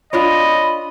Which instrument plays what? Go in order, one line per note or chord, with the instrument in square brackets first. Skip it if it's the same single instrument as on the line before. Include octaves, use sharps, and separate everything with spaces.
[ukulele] D4 F4 C#5 [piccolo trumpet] D#5 [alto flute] B5